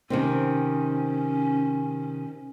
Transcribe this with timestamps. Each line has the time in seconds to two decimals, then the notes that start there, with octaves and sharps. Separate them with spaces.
0.10 C3 D#3 C4 C#4